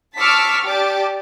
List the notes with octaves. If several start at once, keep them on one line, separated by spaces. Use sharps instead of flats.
A5 C#6 D6 E6 F6 B6
G4 D5 A5 D6